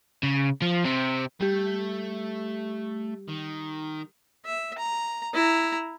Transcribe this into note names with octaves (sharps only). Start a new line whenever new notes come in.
C#3
F3
C3 C4
G3 A3 G4
D#3
E5
A#5
E4 A#5